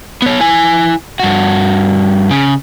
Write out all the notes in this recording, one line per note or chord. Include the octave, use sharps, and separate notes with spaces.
B3 C#5
E4 G#5
G2 F#4
C#3